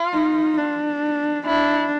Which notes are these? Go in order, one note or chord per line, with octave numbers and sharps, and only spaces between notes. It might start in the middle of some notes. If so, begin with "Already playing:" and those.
Already playing: F4
D#4
D4
D4 E4